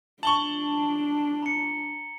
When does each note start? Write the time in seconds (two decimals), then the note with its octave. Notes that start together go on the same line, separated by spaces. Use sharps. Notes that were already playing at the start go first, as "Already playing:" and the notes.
0.23 D4 A5 C#6 F#7 G7
1.43 A#5 C#7